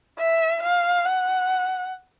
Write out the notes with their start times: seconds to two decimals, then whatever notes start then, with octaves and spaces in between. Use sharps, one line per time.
0.19 E5
0.63 F5
1.06 F#5